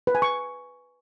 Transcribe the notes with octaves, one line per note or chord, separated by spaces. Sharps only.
B4
G#5
C#6